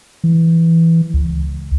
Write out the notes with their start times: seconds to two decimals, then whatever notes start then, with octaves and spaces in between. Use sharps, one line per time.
0.24 E3
1.14 C#2